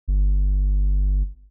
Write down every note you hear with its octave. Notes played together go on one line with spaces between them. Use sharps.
G1